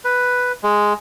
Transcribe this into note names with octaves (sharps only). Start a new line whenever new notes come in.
B4
G#3